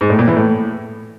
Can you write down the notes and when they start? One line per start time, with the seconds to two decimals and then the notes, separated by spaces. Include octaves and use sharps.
0.01 G#2
0.10 A2
0.19 A#2
0.28 E3
0.37 A2